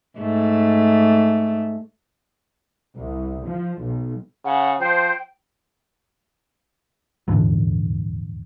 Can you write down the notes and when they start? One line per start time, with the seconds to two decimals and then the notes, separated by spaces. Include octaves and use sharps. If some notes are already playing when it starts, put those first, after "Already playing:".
0.19 G#2 A3
2.99 C2
3.47 F3
3.82 B1
4.45 C#3 F#5
4.80 F3 C5 G5
7.28 D#1 G#1 E2 D3